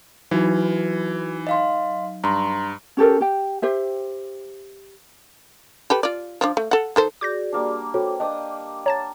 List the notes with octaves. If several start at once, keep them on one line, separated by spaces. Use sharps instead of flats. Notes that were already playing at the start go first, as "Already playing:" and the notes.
E3 F#3 D#4 F#4 B4
D#5 F5 C6
G2 A#5 C6
C#4 G4 A4 A#4
G4 G5
G4 C5 E5
G4 A4 B4
F4 D5
F3 D4
A3
A4 F#5
D#3 A4 C5
F#4 G#4 D5 D6 G6 A#6
G3 A#3 D4
F#4 A4 C5 C#5 G5
D4 D#5 F5 G5 D#6
C#5 A5 A#5 A6